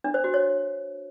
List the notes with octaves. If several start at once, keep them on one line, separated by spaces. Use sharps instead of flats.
D4
C5
F#4
C#5